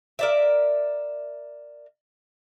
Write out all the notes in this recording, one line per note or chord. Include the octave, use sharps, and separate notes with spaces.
A#4 D5 E5